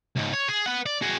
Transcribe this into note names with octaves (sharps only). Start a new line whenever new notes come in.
C#2 G#2
C#5
G#4
B4 F#5
D5
F#4 G#4